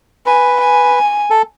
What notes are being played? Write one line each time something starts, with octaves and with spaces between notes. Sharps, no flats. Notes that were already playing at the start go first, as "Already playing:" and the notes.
B4 G#5
G#5
A4